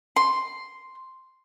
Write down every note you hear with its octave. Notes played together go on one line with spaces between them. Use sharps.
C6